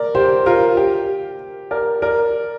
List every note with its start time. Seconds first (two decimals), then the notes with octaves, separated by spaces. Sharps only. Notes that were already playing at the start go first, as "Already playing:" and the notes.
Already playing: A#4 D5
0.15 G4 C5
0.46 F4 A#4
0.77 G4
1.71 A#4 D5
2.02 A#4 D5